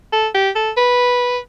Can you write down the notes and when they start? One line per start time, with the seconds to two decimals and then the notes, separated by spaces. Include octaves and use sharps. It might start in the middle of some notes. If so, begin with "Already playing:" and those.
0.12 A4
0.35 G4
0.56 A4
0.77 B4